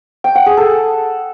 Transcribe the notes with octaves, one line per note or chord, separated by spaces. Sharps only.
G5
F#5
G#4
A4